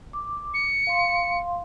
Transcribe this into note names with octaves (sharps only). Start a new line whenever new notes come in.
D6
C#7
F5 C6